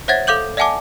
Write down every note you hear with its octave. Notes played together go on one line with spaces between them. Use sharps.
C5 C#5 E5 F#5 G#6 A6
A4 F5 D6 G6 F#7
D5 E5 F#5 G#5 A5 D6